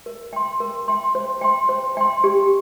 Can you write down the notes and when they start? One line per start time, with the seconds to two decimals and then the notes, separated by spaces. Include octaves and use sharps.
0.06 A#4
0.33 G5 C6
0.60 A#4
0.88 G5 C6
1.15 C5
1.41 G5 C6
1.69 C5
1.97 G5 C6
2.24 G4